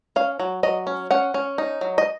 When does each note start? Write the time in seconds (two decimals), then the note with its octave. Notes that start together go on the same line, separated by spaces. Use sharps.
0.16 C#4 F5
0.40 F#3
0.63 F#3 D#5
0.87 C#4
1.11 C#4 F#5
1.34 C#4
1.58 D#4
1.81 F#3
1.98 D#5